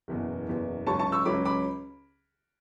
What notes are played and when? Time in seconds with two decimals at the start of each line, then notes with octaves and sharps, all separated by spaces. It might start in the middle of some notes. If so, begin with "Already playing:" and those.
0.08 F#1 E2 B2
0.47 F#1 E2 B2
0.86 C#2 C#3 F#3 C#4 A5 C#6
0.99 A5 C#6
1.12 C#6 E6
1.25 C#2 C#3 F#3 C#4 B5 D6
1.45 B5 D6